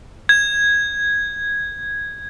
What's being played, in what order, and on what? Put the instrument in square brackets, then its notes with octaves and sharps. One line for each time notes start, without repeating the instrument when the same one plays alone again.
[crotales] G#6